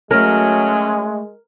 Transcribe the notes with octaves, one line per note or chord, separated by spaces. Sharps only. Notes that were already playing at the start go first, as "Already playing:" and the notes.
F#3 G#3 A3 C#4 A#4